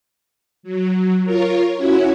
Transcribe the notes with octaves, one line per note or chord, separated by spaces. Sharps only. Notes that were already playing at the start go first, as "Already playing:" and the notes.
F#3
F4 A#4 C#5
C#4 E4 F#4 C#5